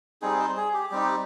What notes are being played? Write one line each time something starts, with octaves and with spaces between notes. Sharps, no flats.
G3 C4 D#4 G#4
C5
G#4
G4
G3 C4 D#4 G4